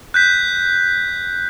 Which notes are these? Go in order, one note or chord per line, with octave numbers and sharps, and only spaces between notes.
F#6 G6 B6